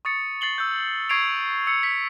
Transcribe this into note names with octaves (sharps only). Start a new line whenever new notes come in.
C#6 D#6 A6 C#7
A6 C7 F#7 G7
E6 G6
C#6 G#6 C7 D7 F7
E6 C#7
B6